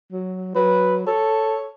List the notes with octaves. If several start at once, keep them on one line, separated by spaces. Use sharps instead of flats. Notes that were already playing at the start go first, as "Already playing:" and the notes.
F#3
F#3 B4
A4 C#5